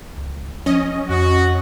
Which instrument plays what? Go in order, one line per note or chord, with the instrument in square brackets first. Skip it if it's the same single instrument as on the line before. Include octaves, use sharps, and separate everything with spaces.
[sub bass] C#2
[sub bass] F3 [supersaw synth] C#4 D#5
[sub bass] F2 [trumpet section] F#4